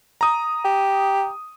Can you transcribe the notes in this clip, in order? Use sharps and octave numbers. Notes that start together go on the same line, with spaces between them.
A#5 D#6
G4